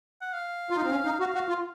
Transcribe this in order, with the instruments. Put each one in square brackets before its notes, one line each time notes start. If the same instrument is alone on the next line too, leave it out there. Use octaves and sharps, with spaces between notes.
[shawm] F#5
F5
[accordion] F4
D#4
C4
C#4
D#4
[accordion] F#4 [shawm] F5
[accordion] F#4
F4